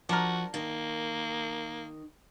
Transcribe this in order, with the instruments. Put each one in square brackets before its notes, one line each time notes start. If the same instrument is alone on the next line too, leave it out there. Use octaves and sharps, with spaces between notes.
[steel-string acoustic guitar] F3 [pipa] D4 A#4 [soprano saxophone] F#4
[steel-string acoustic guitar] D#3 [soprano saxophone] A#3